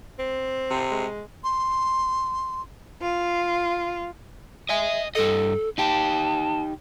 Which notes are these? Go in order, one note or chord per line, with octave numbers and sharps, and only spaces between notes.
C4
C3
G#3
C6
F4
D#5 E5 G#5
G2 A4 D#5
D#4 G4 A5